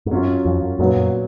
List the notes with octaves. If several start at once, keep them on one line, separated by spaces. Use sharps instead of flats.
G#2
F#2 F#3 C#4 F4
F2
F#2
F#2 A#2 F#3 B3
F#2